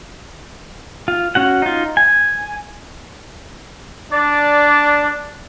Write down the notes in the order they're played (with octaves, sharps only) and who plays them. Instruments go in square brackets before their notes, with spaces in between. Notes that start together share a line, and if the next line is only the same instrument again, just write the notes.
[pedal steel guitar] F4
C#4 F#4 F#5
D#4 F4
G#5
[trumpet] D4 [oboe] D5